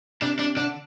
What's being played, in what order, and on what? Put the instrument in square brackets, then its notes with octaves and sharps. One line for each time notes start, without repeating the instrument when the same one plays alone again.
[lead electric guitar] C3 [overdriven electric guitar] D4
[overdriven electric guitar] D4
[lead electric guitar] D3 [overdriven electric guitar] D4